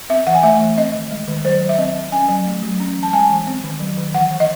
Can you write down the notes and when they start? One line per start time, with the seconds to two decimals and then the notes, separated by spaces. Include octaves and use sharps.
0.10 C4 E5
0.27 E3 F#5
0.35 G#5
0.43 A3 E5
0.60 E3
0.77 C4 D#5
0.94 D#3
1.11 G#3
1.28 D#3
1.45 F#3 C5
1.62 F#3
1.69 E5
1.78 C4 D#5
1.95 C4
2.12 C#4 G#5
2.29 F#3
2.46 A3
2.63 F#3
2.80 C#4
2.96 E3
3.03 A5
3.13 G#3 G#5
3.30 E3
3.47 C4
3.64 D#3
3.80 F#3
3.97 D#3
4.14 E3 F#5
4.31 E3
4.40 D#5